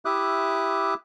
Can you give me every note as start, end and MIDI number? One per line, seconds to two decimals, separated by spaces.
0.05 0.94 64
0.05 0.94 67
0.05 0.94 76
0.05 0.94 86
0.05 0.94 87
0.05 0.94 90